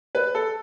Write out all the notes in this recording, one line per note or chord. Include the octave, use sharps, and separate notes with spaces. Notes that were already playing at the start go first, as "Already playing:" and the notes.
B4
A4